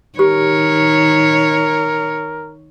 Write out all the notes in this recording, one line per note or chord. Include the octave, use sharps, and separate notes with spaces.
D#3 G4 A#4 C#5